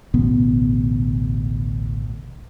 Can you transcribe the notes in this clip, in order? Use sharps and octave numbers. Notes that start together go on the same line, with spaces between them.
A1 D2 B2 B3